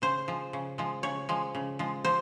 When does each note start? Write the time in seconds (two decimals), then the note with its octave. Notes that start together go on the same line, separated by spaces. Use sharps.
0.02 C#3 C5
0.28 F3 G#3
0.53 C#3
0.78 F3 G#3
1.03 C#3 C#5
1.29 F3 G#3
1.55 C#3
1.79 F3 G#3
2.05 F3 C5